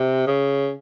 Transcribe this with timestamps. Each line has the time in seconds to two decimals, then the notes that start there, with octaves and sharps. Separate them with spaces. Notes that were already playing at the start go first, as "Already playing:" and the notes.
Already playing: C3
0.27 C#3